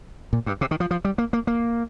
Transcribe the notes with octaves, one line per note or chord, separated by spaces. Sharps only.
A#2
G2
C3
D#3
F3
F3
G3
A#3
A#3
A#3